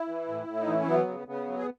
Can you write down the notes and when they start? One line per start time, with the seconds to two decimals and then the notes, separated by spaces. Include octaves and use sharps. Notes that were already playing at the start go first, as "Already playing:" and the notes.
Already playing: E4
0.08 E3
0.28 A2
0.47 A2
0.61 D#4
0.67 E3
0.74 C#4
0.88 F#3 B3
1.08 C#3
1.27 C#3 B3
1.47 F#3
1.58 G#4